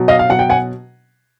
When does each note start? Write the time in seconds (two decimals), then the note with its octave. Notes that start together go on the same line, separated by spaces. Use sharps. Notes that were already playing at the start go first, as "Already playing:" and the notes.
Already playing: B2 F#3
0.08 D#5 F5
0.19 F5
0.29 B2 F#3 F#5
0.39 G5
0.50 F#5 G#5